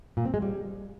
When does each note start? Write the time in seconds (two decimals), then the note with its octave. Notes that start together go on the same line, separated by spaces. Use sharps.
0.17 A#2
0.25 C4
0.34 G#3
0.42 G3